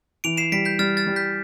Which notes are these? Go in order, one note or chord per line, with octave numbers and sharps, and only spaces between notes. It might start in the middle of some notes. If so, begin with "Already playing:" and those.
E3 D7 F7
C7 E7
G3 B6 D7
G6 B6
G3 F6 A6
F6 A6
G3
G6 B6